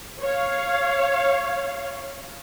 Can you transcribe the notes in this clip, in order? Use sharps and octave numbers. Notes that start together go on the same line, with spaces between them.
C#5 F5